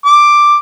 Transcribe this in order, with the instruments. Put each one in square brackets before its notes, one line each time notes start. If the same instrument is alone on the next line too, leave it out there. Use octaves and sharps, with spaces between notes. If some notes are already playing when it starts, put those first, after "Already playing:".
[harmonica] D6